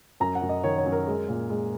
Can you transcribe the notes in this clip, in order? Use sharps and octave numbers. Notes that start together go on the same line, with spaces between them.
F#2 A#5
F#5
F#2
D#5
D#3 C#5
C#5
F#2
A#4
G#3
A#2
G#3